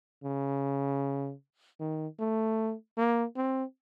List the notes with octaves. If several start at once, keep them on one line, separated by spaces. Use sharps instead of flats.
C#3
D#3
A3
A#3
C4